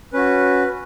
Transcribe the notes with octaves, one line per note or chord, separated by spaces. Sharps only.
C#4 F#4 B4